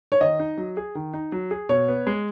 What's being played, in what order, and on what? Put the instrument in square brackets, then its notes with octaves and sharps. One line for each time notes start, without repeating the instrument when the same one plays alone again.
[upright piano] C#5
[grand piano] D#3 [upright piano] D#5
[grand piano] D#4
F#3
G#4
D#3
D#4
F#3
G#4
[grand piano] B2 [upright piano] C#5
[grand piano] B3
G#3